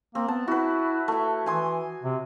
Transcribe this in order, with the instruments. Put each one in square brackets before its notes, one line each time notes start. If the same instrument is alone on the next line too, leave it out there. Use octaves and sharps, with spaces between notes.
[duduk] A#3 [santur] C4
[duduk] B3 [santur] A5
[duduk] E4 [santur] F#4 B4
[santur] A3 E4
[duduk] E3 [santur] G#5 C6 D#6
[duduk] C3